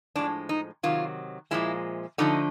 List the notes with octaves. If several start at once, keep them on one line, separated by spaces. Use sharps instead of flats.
A2 F3 G#3 D4
D#4
C3 D#3 F#3 F4
A#2 F3 G#3 E4
D3 F3 A3 D#4